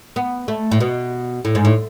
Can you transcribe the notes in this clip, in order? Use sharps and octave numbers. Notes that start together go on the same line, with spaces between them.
B3
A3
A2
B2
A2
G#2
A2